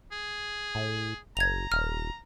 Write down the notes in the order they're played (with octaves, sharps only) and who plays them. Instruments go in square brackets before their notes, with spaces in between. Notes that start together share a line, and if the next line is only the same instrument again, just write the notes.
[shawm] G#4
[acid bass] A2
[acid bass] F#1 [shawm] A#5 [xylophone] G#6 F7
[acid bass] D#1 [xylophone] F6